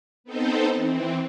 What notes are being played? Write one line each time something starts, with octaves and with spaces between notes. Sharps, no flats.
B3 C4 D#4 A4 C5
E3 C4